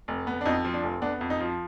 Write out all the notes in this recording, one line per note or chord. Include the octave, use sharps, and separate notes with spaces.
F1
B3
D4
F2 D#4
F3
D4
F1
B3 D4
F2
D#4
F3